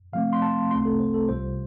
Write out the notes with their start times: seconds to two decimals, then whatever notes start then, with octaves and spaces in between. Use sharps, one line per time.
0.13 C3 F3 A3 C4 F5
0.33 C6
0.42 A5
0.71 C2 C3 A3 C4 F4 C6
0.85 A4
1.00 C5
1.14 A4
1.29 C2 C3 G3 F4 C5